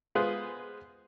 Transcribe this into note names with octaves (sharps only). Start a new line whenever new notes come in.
G#3 B3 F4 G#4 B4 C5